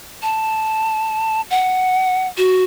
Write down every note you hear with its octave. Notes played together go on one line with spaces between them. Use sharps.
A5
F#5
F#4